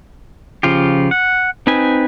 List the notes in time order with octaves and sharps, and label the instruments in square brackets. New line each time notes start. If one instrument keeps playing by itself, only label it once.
[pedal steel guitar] C#3 F3 F4 G4
F#5
C4 D#4 B4 G#5